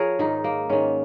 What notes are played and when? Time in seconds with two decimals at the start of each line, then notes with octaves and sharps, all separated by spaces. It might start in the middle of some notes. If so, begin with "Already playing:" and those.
Already playing: F3 G#4 A#4 C#5
0.19 G#2 D#3 D#4
0.44 A#3
0.69 G#2 D#3 C#4